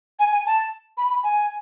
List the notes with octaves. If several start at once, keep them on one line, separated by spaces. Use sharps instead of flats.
G#5
G#5
A5
B5
B5
G#5